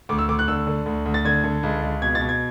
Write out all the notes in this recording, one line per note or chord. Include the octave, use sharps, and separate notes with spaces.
D2 D6
E6
D2 D6
F#6
D3 E6
D3
D2
D2
A6
D3 G#6
D3
C#2
C#2
B2 G#6
A6
B2
G#6